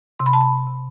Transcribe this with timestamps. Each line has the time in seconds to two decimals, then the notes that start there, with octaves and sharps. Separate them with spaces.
0.19 C3 C6
0.26 B5
0.33 A5
0.41 B5
0.66 C3